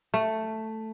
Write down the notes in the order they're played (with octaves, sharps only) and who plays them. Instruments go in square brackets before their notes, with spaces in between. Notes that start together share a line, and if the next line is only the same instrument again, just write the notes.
[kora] A3